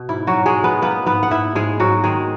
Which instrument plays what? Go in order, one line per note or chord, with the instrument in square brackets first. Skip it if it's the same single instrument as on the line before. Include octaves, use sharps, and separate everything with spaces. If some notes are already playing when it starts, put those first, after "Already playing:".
Already playing: [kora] B2
G#2 E4
F#3 F#4
G#2
G#3 G#4
F#3
B3 B4
A#3 B3 B4
G#2 B3 B4
F#5
G#2 E4 E5
G#2 G#3 G#4
G#2 F#3 F#4
D#3 G#3 G#4